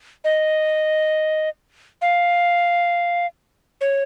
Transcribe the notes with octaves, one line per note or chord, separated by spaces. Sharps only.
D#5
F5
C#5